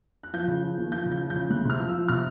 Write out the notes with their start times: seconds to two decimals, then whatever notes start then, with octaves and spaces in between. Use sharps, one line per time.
0.23 F#6
0.33 F3 G6
0.48 C#3
0.63 F3
0.78 D#2
0.92 F3 G6
1.06 C#3
1.12 G6
1.21 F3
1.30 G6
1.36 C#3
1.50 D2 F#6
1.65 C3 F6
1.79 F3
1.89 E6
1.94 F3
2.08 C3 F6